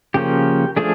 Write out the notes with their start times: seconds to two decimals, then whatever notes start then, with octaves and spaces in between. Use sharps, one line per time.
0.14 C#3 F3 A#3 C#4 G4
0.76 F3 A3 D4 G#4